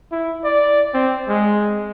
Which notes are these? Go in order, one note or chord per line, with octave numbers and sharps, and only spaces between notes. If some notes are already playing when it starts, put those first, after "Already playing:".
E4
D5
C4
G#3